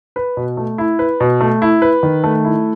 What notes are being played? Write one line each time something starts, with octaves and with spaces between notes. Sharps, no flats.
B4
B2
A3
E4
B4
B2
A3
E4
B4
D#3
A3
E4